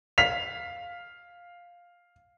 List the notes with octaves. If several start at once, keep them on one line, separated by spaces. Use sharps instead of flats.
F5 B6 F7